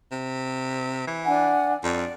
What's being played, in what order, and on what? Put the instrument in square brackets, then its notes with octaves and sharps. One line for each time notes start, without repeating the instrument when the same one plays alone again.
[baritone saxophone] C3
E3
[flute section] D4 F#5 G#5
[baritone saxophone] F2 [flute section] D5